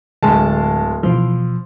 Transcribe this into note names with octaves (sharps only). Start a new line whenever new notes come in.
D1 D3 G#3 A5
B2 E3 F3